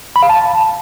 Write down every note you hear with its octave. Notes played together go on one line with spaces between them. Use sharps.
B5
F5
A5